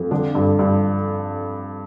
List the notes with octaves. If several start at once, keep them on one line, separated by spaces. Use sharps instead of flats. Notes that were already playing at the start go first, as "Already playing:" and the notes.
Already playing: F2
D3 D4 D5
G2
G2